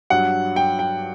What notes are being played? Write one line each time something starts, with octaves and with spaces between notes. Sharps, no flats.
G2 F#3 F#5
G5
G5